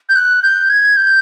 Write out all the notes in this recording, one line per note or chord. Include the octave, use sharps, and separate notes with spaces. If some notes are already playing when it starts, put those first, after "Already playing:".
G6
F#6
G6
G#6
G6